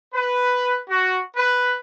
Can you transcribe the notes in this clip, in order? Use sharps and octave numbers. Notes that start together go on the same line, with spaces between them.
B4
F#4
B4